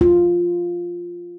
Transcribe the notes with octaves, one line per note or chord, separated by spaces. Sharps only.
F4